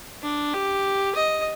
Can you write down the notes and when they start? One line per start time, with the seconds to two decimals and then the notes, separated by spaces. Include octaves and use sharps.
0.23 D4
0.53 G4
1.15 D#5